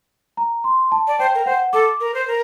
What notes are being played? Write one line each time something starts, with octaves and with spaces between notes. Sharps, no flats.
A#5
C6
A5
D5
C5 G5
A#4
C5 F#5
A4 D6
A#4
C5
A#4